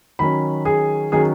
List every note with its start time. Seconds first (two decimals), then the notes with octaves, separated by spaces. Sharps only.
0.19 D#3 F#3 C#4 B5
0.65 G#4
1.12 D#3 F#3 C#4 G#4